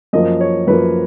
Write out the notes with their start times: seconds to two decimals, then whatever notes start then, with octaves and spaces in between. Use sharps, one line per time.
0.13 F#2 F3 A#3 D#5
0.41 C#5
0.67 F#2 F3 A#3 B4